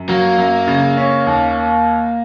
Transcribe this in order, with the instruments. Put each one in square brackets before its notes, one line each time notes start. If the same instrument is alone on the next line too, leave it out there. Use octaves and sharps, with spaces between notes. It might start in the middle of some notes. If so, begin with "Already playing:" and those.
Already playing: [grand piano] F#2
[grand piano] F#3 [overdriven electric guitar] A#3
[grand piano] F#2
C#3
C#4
D#2